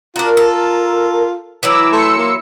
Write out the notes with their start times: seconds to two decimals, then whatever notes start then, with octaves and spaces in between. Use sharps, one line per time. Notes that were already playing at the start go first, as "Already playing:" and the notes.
0.16 D4 F4 F#4 A#4
0.37 A4
1.63 E3 F#3 E4 D6 E6
1.92 A3 C6 E6 C#7
2.18 A#3